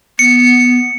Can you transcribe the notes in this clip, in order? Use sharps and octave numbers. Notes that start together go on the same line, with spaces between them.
B3 C#7